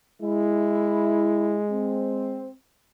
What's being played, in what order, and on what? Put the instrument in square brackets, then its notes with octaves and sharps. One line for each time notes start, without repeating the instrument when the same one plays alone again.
[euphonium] G#3 [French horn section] E4
[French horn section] C4